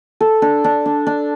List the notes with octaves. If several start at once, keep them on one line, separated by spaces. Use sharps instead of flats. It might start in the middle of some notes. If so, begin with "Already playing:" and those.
A4
D4
D4
D4
D4